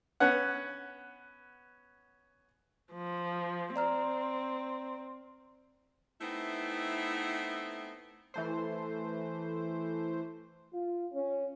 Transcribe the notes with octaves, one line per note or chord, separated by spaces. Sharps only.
B3 C#4 F#5
F3
C4 D5 A#5 F6
A3 B3 C4 D#4 E4
E3 A3 C5
F4
C#4